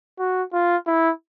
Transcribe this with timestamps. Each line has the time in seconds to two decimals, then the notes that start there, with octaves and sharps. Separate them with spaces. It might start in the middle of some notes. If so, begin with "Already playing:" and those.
0.19 F#4
0.53 F4
0.87 E4